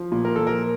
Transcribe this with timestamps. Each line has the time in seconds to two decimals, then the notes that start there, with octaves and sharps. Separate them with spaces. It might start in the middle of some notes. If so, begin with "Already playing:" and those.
Already playing: F3
0.12 A#2
0.25 A#4
0.36 F3 A4
0.47 A#4